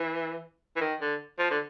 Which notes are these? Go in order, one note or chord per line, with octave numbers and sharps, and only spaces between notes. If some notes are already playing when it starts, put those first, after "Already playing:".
Already playing: E3
E3
D#3
D3
F3
D3